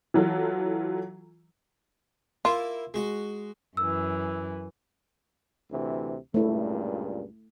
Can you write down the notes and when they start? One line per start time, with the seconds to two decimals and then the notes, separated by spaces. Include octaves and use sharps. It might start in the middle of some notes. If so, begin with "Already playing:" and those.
0.14 E3 F#3 F4 A4
2.45 A#3 E4 F4
2.94 G#3 F#4
3.77 F#2 E3 E6
5.71 D2 C3 E3
6.34 C#2 G2 A#2 A3 E4